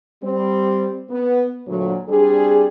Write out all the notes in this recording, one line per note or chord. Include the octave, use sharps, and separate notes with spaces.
G3 C4
B3
D2 A#2 F#3
G3 C4 D4 G#4